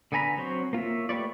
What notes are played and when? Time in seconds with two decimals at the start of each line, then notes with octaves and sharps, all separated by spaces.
0.12 D3 B3 G#5 A#5 B5
0.38 F#3 C4 C5 C#5
0.73 A#3 F4 C#5 E5
1.09 A3 G4 B4 C#5 D5